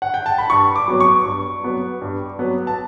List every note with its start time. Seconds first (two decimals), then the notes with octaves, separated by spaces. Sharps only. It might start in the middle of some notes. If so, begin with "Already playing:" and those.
0.02 F#5
0.14 G5
0.26 A5
0.38 B5
0.50 G2 C#6
0.76 D6
0.88 F#3 B3
1.00 C#6
1.26 G2
1.63 F#3 B3
2.01 G2
2.39 F#3 B3
2.67 A5